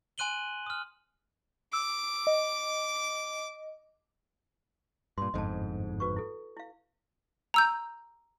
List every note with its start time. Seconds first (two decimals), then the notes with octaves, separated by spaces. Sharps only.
0.18 G#5 C6 F#6 D#7 F#7 G7
0.66 D#6 F6
1.73 D6 E6
2.27 D#5
5.18 G2 A#2 C6
5.34 G1 F2 G#2 D#5 A5
6.00 F#4 B4 C#6
6.16 E4 A4
6.57 E4 F5
7.54 A#5 E6 G6